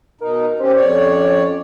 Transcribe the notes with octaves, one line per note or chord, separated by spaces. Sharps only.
B2 D#4 A#4
C#4 G4 C5
F2 C#5 D5
C#4